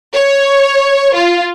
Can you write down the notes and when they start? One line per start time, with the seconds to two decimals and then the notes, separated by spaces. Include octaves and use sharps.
0.15 C#5
1.14 F4